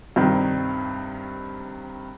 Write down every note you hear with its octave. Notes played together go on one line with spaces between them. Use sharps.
G2 C3 D#3